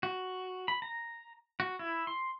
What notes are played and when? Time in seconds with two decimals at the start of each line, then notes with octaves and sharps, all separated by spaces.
0.03 F#4
0.68 B5
0.82 A#5
1.60 F#4
1.79 E4
2.07 C6